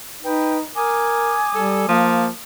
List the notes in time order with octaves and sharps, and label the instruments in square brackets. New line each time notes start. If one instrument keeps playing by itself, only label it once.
[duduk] D#4 [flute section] B4 G5
[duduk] A#4 [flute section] G#5 D6 D#6
[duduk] G3 [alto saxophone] A4
[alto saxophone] F3 [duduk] A#3